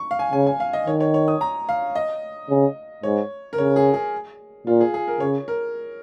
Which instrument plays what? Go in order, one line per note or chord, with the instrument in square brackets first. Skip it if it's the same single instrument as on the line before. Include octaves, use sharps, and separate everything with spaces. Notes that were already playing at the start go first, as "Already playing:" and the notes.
Already playing: [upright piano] C#6
F5
G#5
[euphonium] C#3 [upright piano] G#5
[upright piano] G#5
F5
D#5
[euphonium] D#3 [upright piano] C#5
[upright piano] C#5
C#5
D#6
A#5
F5
D#5
[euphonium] C#3
[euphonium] G#2 [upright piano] C#5
[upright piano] A#4
[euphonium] C#3 [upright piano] C#5
[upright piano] G#4
G#4
[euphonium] A#2 [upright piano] F4
[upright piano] G#4
G#4
A#4
[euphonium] C#3 [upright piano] C#5
[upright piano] A#4